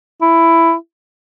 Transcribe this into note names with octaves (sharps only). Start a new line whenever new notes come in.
E4